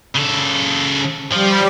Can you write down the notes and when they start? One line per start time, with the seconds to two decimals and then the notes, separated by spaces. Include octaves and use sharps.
0.15 C#3 A4
1.32 F3 G3